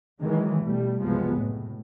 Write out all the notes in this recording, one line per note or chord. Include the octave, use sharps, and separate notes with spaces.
D#3 E3 F#3 G#3
B2 G3 A3
F#1 C2 F3 F#3 G#3 B3
A2